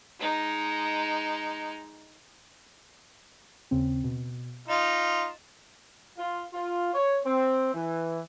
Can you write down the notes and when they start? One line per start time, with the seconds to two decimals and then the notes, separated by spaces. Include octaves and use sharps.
0.20 G#3 D#4
3.71 D#2 C#3 C4
4.04 B2
4.68 D#4 F4 D#5 A6 E7
6.18 F4
6.53 F4
6.94 C#5
7.25 C4
7.73 E3